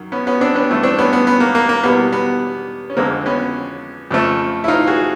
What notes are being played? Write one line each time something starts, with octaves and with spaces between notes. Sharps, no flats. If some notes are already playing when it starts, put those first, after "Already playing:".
Already playing: F#2 D#3
B3 C#4
B3 C#4
C4 D4
B3 C#4
G2 E3 A3
C4 D4
B3 C#4
B3
B3
A#3
A#3
A#3
E2 B2 G3 B3
B3
C#4
F2 D3 F3 G#3 A#3 C4
B3 C#4
F2 C#3 F3 A3
E4
D#4 F4
F#4 G#4